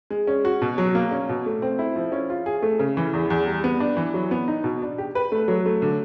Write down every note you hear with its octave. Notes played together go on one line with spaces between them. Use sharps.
G#3
C#4
F#4
B2
F#3
A#3
C#4
B2
A3
C4
E4
F3
C#4
F4
G#4
A3
C#3
E3
E2
E2
G3
B3
D4
E3
F#3
B3
D#4
B2
D4
G4
B4
A3
F#3
A3
D3